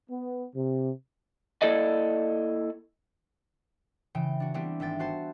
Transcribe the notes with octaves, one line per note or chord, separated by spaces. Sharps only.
B3
C3
A#3 E4 A4 D5 D#5
C#3 E3 G5
D4 F#4
G3 B3 C4 D4 E4 G4
G#1 E5 G5 A6
B3 F#4 C5 A5